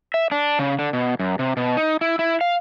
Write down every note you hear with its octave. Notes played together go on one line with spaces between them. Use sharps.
E5
D4
C#3
D3
B2
F#2
C3
B2
D#4
E4
E4
F5